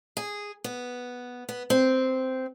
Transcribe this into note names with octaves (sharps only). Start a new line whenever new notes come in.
G#4
B3
B3
C4